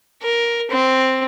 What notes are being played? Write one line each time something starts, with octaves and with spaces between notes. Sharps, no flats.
A#4
C4